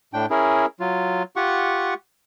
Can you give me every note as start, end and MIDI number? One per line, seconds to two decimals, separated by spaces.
0.14 0.26 45
0.14 0.26 62
0.14 0.26 79
0.30 0.66 61
0.30 0.66 64
0.30 0.66 68
0.30 0.66 70
0.80 1.23 54
0.80 1.23 65
1.36 1.94 65
1.36 1.94 67
1.36 1.94 78
1.36 1.94 85